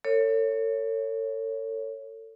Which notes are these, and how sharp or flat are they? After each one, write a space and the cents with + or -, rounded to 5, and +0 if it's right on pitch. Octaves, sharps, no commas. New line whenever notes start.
A4 +40 C#5 +0